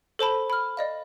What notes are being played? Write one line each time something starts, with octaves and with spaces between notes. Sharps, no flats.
A4 C5 A5 B5
B5 F6
D5 D#5 F5